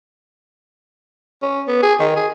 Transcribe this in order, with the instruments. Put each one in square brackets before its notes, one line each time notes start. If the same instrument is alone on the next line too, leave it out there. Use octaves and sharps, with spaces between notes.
[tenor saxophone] C#4
B3
G#4
D#3
G#4